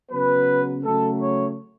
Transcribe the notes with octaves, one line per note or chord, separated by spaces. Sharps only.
C#3 F#3 B3 B4
C#3 F#3 A3 A4
C#5